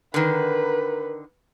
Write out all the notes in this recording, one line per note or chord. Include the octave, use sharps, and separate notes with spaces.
D3 D#3 A#4 B4